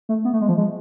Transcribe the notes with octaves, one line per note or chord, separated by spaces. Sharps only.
A3
B3
A3
G#3
F3
G#3